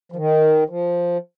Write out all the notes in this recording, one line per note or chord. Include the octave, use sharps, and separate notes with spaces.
F3
D#3
F3